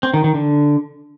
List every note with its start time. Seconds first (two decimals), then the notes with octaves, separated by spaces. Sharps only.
0.03 C4
0.14 D#3
0.24 D#3
0.35 D3